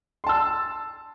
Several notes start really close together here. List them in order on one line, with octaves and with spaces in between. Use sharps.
C6 A5 E6